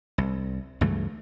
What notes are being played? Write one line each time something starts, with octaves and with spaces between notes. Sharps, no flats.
C2
C#2 G2 E3 A3